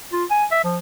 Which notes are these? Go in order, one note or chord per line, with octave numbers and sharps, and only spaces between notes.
F4
G#5
E5
F3